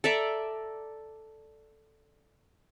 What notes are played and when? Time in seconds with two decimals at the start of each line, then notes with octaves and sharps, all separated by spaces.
0.04 A4 D5 E5 A#5